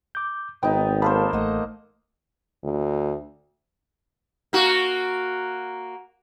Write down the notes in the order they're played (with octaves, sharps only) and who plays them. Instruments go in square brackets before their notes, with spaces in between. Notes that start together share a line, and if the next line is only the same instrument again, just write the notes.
[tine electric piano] D6 G6
[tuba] G#1 [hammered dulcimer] B3 D#4 [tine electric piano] G5
[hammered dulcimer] A#3 A4 C5 [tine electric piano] F5 A5 B5
[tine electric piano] A1 [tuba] A3 [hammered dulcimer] D#5 F#5
[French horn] D2
[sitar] A#3 F#4